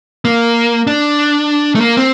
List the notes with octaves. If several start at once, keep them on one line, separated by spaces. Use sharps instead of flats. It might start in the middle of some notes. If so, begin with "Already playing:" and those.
A#3
D4
A3
A#3
C4